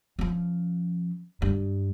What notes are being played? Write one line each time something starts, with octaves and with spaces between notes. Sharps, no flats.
F3 C#4
G2